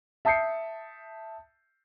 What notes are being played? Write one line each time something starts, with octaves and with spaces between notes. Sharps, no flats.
E5 A5 D#6 G6 C7 C#7